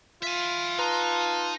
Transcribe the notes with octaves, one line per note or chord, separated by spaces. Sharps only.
F4 E5 G#5
D#4 B4 A5 A#5 C6